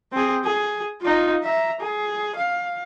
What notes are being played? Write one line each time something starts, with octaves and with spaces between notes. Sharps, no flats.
C4 G#4
G#4
D#4 F4
E5 A#5
G#4
F5